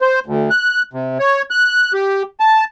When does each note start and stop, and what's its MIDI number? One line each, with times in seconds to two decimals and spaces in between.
0.01 0.20 72
0.26 0.50 38
0.50 0.82 90
0.93 1.18 48
1.20 1.42 73
1.50 1.93 90
1.93 2.23 67
2.40 2.64 81